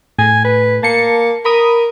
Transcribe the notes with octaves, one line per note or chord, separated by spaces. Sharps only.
A2 G#5
B4
A#3 A5 C#7
A#4 B5 D#6